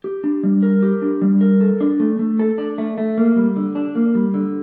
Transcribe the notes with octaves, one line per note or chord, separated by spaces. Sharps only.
G4
D4
G3
A#4
G4
D4
G3
A#4
A4
D4
A3
A3
A4
D4
A3
A3
A#3
G3
D3
D4
A#3
G3
D3